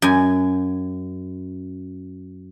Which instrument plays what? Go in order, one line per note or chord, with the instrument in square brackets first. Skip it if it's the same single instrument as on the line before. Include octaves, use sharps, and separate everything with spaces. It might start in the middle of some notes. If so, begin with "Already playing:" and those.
[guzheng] F#2 G#5